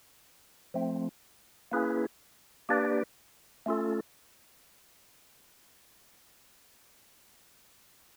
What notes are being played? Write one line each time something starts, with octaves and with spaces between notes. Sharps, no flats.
F3 A3 C4
A#3 C#4 E4 G#4 B4
A#3 D4 G4 B4 D5
A3 C#4 F4 A4